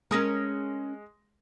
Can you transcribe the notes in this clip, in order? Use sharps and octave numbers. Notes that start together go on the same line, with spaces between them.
G#3 C#4 G#4 A#4 D#6 A#6